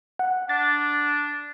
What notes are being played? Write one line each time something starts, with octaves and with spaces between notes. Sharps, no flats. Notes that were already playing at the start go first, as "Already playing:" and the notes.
F#5
D4 A6